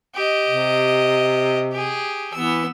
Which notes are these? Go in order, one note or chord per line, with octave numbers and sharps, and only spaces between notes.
G4 D#5
C3
G4 G#4
E3 B3 E6